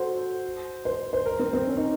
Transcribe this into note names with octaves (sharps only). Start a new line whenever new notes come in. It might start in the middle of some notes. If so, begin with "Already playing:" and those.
Already playing: F#4 A4 C5
C5
C5
A#4
C4
C4
C#4
D#4